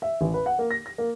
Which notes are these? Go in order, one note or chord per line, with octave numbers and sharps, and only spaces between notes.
E5
A1
B4
F#5
A#3
A#6
A#6
A#3